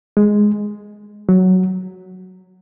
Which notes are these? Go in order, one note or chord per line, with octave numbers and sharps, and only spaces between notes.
G#3
F#3